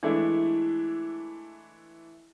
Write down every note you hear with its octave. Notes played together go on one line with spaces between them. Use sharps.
E3 G#3 A3 D4 E4